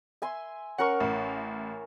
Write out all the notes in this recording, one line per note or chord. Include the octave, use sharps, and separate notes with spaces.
E5 G#5 C6
C#4 A#4 F#5 C#6
A1